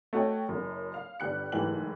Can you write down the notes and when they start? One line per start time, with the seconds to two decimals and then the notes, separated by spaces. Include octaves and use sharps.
0.13 A3 F#4 C#5 D#5 G5
0.49 F#1 F#2
0.94 F5
1.20 G1 G3 F#6 C#7
1.52 F#1 G#2 E3 A3 G4 F#7